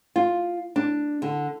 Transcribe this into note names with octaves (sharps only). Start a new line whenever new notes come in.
F4
D4
D3